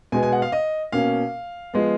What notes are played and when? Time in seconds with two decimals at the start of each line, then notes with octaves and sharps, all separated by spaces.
0.12 B2 G#3 B3 G#5
0.23 G#5
0.32 F#5
0.42 F5
0.52 D#5
0.92 B2 A#3 C#4 F5
1.74 F3 G#3 B3